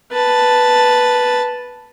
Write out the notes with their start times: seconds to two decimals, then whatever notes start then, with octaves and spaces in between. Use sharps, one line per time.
0.12 B4 A5